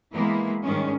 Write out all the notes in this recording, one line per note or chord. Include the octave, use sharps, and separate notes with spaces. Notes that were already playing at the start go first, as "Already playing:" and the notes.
E3 G#3 A#3 B3 E4
G#2 D#3 G3 G#3 C#4 D4